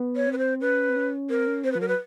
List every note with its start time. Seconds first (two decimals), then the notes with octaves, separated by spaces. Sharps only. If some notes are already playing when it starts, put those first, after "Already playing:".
Already playing: B3
0.16 C#5
0.27 C4
0.33 B4
0.38 C5
0.61 C#4 B4
0.89 C4
0.96 C#4
1.30 C4 A#4
1.47 C#4
1.64 C4 C5
1.72 F3 B4
1.81 F#3 A#4
1.88 B4